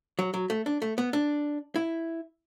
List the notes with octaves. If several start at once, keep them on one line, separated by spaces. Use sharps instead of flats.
F#3
F#3
A3
D4
A3
B3
D4
E4